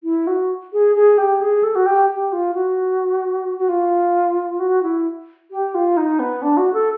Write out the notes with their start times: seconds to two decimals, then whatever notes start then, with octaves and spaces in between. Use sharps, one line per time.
0.04 E4
0.27 F#4
0.73 G#4
0.96 G#4
1.18 G4
1.41 G#4
1.63 A4
1.75 F#4
1.86 G4
2.09 G4
2.32 F4
2.55 F#4
3.58 F#4
3.69 F4
4.60 F#4
4.83 E4
5.51 G4
5.74 F4
5.97 D#4
6.19 B3
6.42 D4
6.57 F#4
6.73 A4